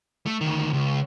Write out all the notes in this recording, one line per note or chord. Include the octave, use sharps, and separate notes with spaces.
A3
D2 D#3
C#2